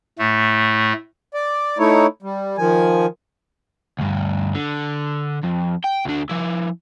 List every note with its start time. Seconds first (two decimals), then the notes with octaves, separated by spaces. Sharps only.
0.19 A2 A3
1.34 D5
1.78 A3 D#4 E4 C#5
2.22 G3
2.58 D#3 F3 G#5
3.99 D2 G2
4.54 D3
5.44 F2
5.84 G5
6.05 D2 D4
6.29 F3 E4